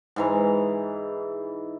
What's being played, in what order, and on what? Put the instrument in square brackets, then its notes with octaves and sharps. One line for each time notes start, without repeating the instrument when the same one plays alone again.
[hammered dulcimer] G#2 E3 A#5